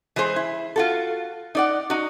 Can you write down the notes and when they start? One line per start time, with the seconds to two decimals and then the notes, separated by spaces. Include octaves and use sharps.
0.16 E3 G#3 G#4 C5
0.36 E4
0.76 F4 F#4 A4
1.55 D#4 D5 F#5
1.90 D#4 F#4